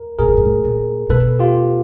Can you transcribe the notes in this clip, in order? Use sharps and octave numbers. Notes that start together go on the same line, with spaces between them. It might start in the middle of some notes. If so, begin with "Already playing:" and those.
Already playing: A#4
A#2 G#4 A#4
A2
G#2
A2
A#2
B2 A4 B4
F4 G4